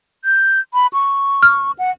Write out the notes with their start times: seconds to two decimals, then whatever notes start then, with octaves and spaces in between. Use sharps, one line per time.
0.25 G6
0.74 B5
0.93 C#6
1.43 F6
1.79 F#5